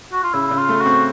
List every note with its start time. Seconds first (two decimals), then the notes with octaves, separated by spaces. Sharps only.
0.13 F#4
0.23 F4
0.33 C#3 E4
0.51 C#3
0.57 F4
0.69 A3
0.80 F#4
0.86 C4